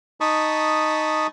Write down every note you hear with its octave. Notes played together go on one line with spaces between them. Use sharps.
D#4 A5 B5 C#6 D#6